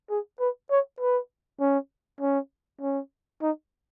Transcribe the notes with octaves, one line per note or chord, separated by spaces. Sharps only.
G#4
B4
C#5
B4
C#4
C#4
C#4
D#4